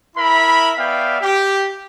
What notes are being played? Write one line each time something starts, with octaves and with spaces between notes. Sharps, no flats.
E4 A#4 E5 B5
B3 D5 E5 F5 G5
G4